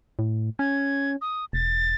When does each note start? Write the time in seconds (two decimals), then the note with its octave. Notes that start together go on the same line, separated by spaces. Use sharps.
0.19 A2
0.59 C#4 G#6
1.21 D#6
1.53 E1 A6